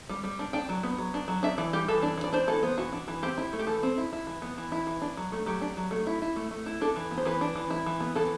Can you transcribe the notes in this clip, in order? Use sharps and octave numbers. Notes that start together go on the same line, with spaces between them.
G3
G3
D4
D4 G5
F#3
B3
F#3
D4
F#3
D4 E5
E3 D5
G3 G4
E3 A4
D4
E3
D5
D4 C5
E3 A4
B3 C5
E3 F#4
D4
E3
C4 G4
E4
A3
G4
E3 A4
C4
E4
E4
E3
B3
E3
E4
E3
D4
F#3
A3
F#3 G4
D4
F#3
A3
E4
E4
A3
A3
E4
D4 A4
E3
B3
C5
E3 B4
D4
E3
E4
E3
B3
E3 A4